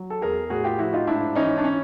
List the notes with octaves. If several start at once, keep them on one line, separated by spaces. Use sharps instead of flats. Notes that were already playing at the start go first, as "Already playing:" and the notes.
Already playing: F#3
A4
E2 G#4 A#4
A2 F#4 G#4
F4 G4
F3 E4 F#4
D#4 F4
G#2 D4 E4
E3 C#4 D#4
D4
C#4